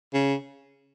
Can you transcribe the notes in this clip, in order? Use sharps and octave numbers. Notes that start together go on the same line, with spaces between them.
C#3